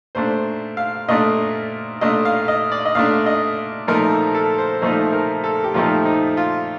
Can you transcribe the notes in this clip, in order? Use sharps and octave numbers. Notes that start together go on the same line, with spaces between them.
A#2 A3 D4 C5
F5
A#2 A3 D4 D#5
A#2 A3 D4 D#5
F5
D#5
D5
D#5
A#2 A3 D4 F5
D#5
A#2 F3 A3 D#4 A#4
A4
A4
C5
A#2 F3 A3 D#4 C5
A#4
A4
G4
A#2 F3 A3 D#4 F4
D#4
F4